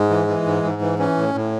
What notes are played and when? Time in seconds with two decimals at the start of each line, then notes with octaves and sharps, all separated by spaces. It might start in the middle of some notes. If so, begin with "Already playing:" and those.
Already playing: G#2 G#3
0.10 E3
0.28 E3
0.46 G#2
0.63 G#2
0.81 E3
0.99 E3 C#4
1.17 A2
1.35 A2